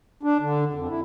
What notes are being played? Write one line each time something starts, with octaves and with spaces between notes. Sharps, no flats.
D4
D3
F2
E4